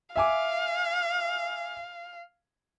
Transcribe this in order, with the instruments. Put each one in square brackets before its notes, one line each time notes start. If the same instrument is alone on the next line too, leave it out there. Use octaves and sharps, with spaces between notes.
[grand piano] E5 G#5 D6 [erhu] F5